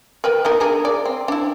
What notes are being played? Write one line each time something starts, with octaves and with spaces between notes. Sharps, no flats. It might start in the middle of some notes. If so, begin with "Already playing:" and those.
A#4 B4 G5
B3 D#4 A#4
D4 G#4 A#4
D5
C4
D4 E4